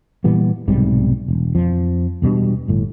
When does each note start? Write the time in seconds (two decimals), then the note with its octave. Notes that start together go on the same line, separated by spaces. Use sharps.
0.24 A#2 E3 G3 B3
0.68 B1 G#2 C3 G3
1.28 E1
1.55 F2 F3
2.22 E1 B2 G3 D4
2.68 G1 A2